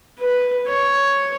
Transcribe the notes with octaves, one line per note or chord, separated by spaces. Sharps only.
B4
C#5